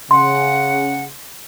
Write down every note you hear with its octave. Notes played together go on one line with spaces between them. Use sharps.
C#3 F#5 C6